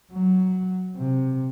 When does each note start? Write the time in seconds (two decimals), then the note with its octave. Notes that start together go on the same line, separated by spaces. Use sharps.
0.13 F#3
0.96 C3